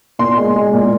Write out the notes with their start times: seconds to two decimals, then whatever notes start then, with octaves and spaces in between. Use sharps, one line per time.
0.19 A#2 C6
0.38 G#3
0.56 G#3
0.73 A#2